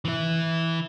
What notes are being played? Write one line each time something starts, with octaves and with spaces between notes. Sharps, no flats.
E3 E4